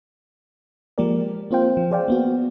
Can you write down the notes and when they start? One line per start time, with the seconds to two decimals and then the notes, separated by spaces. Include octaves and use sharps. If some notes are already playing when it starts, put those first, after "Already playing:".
0.98 F3 G#3 A#3 G4 A#4 D5
1.51 A#3 C4 F4 C5 F5 G5
1.77 F3
1.91 G#4 C5 D5 F5 G5
2.08 A#3 B3 F#4